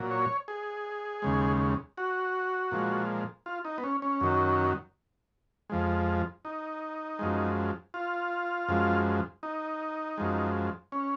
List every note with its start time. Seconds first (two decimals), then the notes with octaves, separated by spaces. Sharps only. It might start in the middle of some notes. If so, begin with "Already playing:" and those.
Already playing: A#2 F#3
0.11 C#5
0.48 G#4
1.22 D#2 C#3 G#3
1.98 F#4
2.72 A#2 F3 G#3
3.46 F4
3.65 D#4
3.78 B3
3.84 C#4
4.02 C#4
4.21 F#2 D#3 F#3
5.70 F2 F3 G#3
6.45 D#4
7.19 F#2 F3 G#3
7.94 F4
8.69 F#2 F3 G#3
9.43 D#4
10.18 F#2 F3 G#3
10.92 C#4